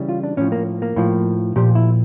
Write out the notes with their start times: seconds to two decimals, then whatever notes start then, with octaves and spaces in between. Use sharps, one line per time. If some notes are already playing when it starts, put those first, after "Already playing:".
Already playing: C#3 E3 G3
0.09 F4
0.23 D4
0.37 A2 F3 C#4
0.52 A#3
0.82 A#3
0.96 A2 F3
1.56 A#2 F3 G4
1.75 E4